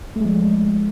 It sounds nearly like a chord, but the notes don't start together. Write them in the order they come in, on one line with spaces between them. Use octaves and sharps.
A3 G#3 F3